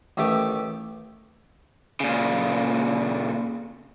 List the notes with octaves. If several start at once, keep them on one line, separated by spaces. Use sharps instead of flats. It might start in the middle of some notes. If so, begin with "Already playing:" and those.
A1 D#3 A3 G4 D6
A#2 C#3